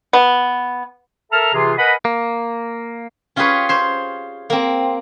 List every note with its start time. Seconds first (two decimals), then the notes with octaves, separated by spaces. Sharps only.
0.13 B3
1.32 A4 A#4 E5 A5 A#5 F6
1.54 C3 E3 F4 G#4
1.78 A#4 B4 D#5 F#5 G#5 B5
2.05 A#3
3.36 C#4 F4 G4 G#4 B4 C#5
3.69 C5 C#5 C6
4.50 A#3 C4